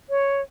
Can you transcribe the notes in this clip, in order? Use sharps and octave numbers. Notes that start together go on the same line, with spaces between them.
C#5